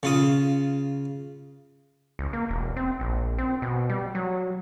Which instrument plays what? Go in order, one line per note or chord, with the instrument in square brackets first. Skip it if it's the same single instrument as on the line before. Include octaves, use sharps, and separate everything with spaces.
[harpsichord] C#3 F4 D#6
[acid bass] C#2
A#3
E1
C4
A#1
C4
B2
G3
F#3